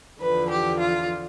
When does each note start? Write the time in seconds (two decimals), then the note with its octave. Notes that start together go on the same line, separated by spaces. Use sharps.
0.21 E2 D3 F3 B4
0.50 G4
0.80 F4